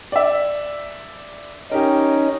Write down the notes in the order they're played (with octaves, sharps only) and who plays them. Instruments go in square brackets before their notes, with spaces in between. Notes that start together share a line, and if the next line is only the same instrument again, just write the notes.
[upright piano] D5 E5
[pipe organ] C#4 D#4 [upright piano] G4 A#4